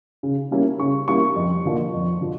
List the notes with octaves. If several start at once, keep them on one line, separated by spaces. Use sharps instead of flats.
C#3
G3 A#3 C#4 E4
C#3 C#6
G3 A#3 C#4 E4 C#6
F2
D3 F3 A#3
F2
D3 F3